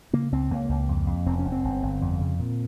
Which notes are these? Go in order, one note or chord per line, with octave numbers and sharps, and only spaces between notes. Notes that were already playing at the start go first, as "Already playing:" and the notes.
C#3 A#3
C#2 C4
C#2 A#3
C#2
F2
F2
F1 C4
C#4
F1
C4
G1
G1
F2
C#3
A#2